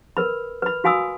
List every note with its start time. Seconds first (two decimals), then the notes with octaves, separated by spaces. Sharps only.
0.17 A#4 B4 B5
0.62 B4 B5
0.84 F#4 F5 G#5 B5 D#6 E6